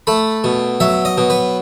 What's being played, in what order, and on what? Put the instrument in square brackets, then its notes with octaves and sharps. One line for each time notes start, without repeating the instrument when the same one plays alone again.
[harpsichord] A3 B5
B2
F#3 E5
D#5
B2
B4